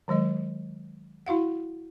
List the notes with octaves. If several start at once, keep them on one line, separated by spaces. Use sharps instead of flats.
D#3 F#3 G#3 D#5
E4 F#4 F5 F#5